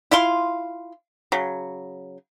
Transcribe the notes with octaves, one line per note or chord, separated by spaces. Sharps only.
E4 F4 F5 C6
C#3 F#3